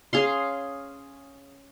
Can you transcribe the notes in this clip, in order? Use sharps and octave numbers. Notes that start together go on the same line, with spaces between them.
C#4 G#4 F5 C6